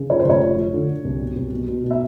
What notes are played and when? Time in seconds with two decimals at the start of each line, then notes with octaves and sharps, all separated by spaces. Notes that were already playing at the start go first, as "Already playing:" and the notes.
Already playing: C#3
0.10 F3 C#5
0.20 C5
0.25 F1 C#5
0.41 F3
0.57 F3
0.73 D3
0.89 D3
1.05 C2
1.20 B2
1.36 C2
1.53 B2
1.68 B2
1.84 B2
1.91 E5